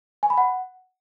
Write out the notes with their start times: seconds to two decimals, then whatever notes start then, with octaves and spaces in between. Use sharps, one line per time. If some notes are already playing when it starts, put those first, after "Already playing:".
0.23 G#5
0.30 B5
0.38 F#5